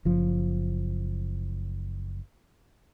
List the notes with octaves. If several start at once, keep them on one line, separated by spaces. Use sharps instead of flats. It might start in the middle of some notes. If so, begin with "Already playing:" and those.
F#1 F3